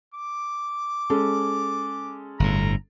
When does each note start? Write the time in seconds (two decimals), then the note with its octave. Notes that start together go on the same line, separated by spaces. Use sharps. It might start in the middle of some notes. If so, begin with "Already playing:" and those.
0.14 D6
1.10 G#3 C#4 A4
2.40 G1 A2 A#5